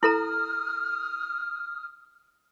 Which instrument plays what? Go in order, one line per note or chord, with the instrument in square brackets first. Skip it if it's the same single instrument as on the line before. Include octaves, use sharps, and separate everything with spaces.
[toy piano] E4 A4 A#5 [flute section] D#6 F6